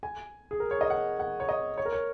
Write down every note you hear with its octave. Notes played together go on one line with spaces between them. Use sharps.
G#5
G#4
A#4
C#5
D#5
F#5
F#5
C#5
D#5
C#5
A#4
C#5